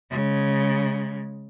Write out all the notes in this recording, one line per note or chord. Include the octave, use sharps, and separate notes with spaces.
C#3 G#3